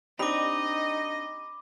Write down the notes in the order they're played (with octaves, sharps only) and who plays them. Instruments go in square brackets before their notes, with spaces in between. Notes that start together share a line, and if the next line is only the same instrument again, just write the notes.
[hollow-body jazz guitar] C4 D4 G4 [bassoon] D#4 [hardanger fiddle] D#5 [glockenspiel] B5 D6